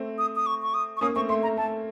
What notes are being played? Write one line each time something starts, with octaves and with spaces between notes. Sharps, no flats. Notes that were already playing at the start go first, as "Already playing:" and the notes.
Already playing: A3 C4
D#6
D#6
C#6
C#6
D#6
C#6
A#3 C#4 D#6
A3 C4 C#6
A3 C6
A3 A#5
A3 A5